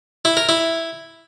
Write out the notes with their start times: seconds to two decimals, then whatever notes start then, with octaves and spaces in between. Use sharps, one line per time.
0.25 E4
0.37 A#4
0.49 E4